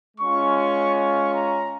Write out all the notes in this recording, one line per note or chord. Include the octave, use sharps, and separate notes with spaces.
G#3 C#4 F4 C#6
C#6
C#6
A#5